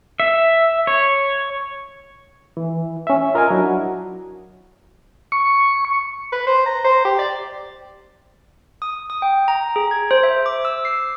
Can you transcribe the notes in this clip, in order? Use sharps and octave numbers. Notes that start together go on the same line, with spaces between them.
E5
C#5
E3
C#4 E5
F4 A#4 D#5 F5 G#5
F#3 D4 E4 F#4
C#6
B4
C5
A#5
C5
G4
D5
D#6
D#6
G5
A#5
G#4
G#6
C5
E5
D6
E6
C7